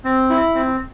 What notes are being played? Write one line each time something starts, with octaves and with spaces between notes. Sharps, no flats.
C4
E4
C4